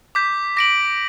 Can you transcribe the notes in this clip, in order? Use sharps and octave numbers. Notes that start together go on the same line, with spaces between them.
D6 G6 B6
D6 A#6 D7 F#7